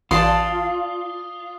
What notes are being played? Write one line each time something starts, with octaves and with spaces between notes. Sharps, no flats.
A1 F4 D5 A5 C6 D#6